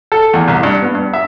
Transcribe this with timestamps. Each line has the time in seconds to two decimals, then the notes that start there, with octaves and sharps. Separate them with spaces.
0.12 A4
0.34 E2
0.48 C2
0.63 G2
0.82 B3
0.95 G2
1.13 E5